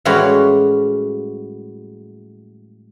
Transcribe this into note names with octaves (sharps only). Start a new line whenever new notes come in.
A2 E3 G3 G#3 C#4 F#4